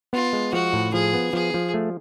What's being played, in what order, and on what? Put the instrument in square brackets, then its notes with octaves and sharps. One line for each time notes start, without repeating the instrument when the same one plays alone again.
[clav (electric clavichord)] B3 [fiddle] F4
[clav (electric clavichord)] G#3
[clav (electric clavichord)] F3 [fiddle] F#4
[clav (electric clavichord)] A2
[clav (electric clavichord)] F3 [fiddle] G#4
[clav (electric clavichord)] B3
[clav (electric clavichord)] F3 [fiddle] G#4
[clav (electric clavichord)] F3
A3